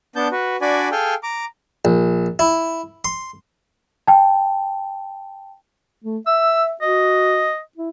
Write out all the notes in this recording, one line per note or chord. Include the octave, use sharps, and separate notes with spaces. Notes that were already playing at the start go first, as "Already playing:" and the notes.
B3 D4 A5 G6
F#4 B4
D4 F#4 D5 G#5 B5
G#4 A4 F5 G5
A#5 D6
A#1
E4
C6
G5 A5
A3
E5 E6
F#4 D#5
E4